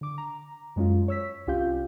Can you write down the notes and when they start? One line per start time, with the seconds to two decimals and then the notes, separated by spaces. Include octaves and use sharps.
0.01 D3 D6
0.18 A#5
0.76 F#2 G#3 C#4 F4
1.08 C#5 E6 B6
1.47 C2 C#4 F4 G4 F5 G6